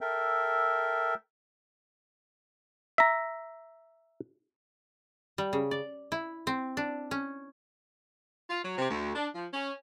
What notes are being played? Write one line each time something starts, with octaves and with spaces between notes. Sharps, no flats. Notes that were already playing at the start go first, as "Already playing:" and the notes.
A4 A#4 E5 G5
E5 A#5
G3
C#3
D5
E4
C4
D4
C#4
F4
F#3
C3
D2
D4
F3
C#4